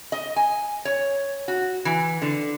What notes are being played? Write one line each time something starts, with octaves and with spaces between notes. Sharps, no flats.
D#5
G#5
C#5
F#4
E3
D3